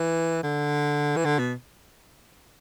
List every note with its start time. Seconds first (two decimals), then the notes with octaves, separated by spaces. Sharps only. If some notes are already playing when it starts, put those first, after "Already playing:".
Already playing: E3
0.43 D3
1.17 E3
1.25 D3
1.39 B2